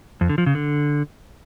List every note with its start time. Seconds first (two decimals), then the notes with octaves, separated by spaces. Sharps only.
0.21 F2
0.29 D3
0.38 F3
0.46 C#3
0.55 D3